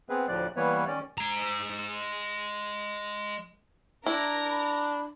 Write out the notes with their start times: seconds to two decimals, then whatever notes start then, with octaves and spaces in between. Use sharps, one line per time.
0.09 B3 C4 G#4 B4
0.28 D2 A2 F3 D5 F#6
0.56 E3 G3 A#3 B3 B4 C#5
0.87 D#3 C#4 D5
1.18 G#3 A#5
4.06 D4 E4 A#4 A#5
4.49 B5